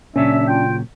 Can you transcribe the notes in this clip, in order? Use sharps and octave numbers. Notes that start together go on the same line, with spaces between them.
A#2 C#3 F#3 C#4 D4 E5
F4 G5